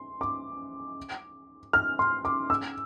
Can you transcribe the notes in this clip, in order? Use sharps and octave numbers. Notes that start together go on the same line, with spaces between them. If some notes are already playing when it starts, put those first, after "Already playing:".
Already playing: C6
D6
F6
C6
D6
E6